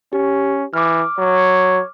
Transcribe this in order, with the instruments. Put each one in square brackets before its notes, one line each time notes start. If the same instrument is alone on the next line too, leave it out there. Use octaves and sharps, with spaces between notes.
[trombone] C#4 [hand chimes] G4
[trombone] E3 [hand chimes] D6 F6
[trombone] F#3 [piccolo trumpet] C#5